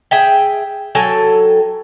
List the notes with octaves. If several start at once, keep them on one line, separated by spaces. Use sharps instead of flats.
G#4 E5 G5
F#3 A4 G5 G#5